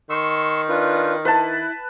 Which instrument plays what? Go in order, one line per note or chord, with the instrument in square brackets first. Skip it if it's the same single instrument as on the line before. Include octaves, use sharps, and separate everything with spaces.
[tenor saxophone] D#3 [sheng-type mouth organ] C6 C#6 E6
[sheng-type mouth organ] D4 F4 B4
[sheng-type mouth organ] E4 [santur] B4 A5